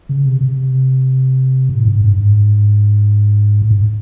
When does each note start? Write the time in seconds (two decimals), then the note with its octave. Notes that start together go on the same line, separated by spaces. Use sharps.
0.09 C#3
0.26 C3
0.41 C3
1.69 A2
1.85 G#2
2.01 G2
2.18 G#2
3.62 A2
3.71 G#2